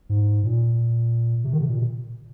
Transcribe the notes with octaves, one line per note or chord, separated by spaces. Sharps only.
G#2
A#2
C3
D#3
C3
A#2